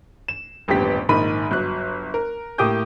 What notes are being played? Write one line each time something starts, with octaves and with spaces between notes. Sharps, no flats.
E7
D#1 A1 G2 B3 G4 B6
A#1 G#2 D#3 B5 D#7
G1 F#3 F#6
A#4
A2 A#3 G4 D6 D#6 G6